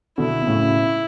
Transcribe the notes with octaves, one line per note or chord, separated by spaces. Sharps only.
B2 D3 E4
B2
A2 C#3